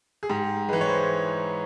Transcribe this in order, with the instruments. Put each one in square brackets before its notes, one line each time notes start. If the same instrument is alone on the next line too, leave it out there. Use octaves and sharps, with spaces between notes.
[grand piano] G#4
G#2 G4
E3 G#3 B4
C#5
C5